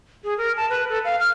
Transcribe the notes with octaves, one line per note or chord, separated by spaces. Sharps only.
G#4
A#4
A5
B4
A4
F5
F6